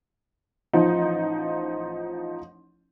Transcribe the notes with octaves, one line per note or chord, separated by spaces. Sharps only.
A1 F3 D#4